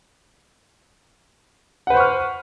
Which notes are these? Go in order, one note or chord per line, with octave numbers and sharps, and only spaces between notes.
B4 C5 F#5 C#6 F6